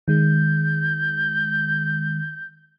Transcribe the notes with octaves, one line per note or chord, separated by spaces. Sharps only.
D#3 G#3 G6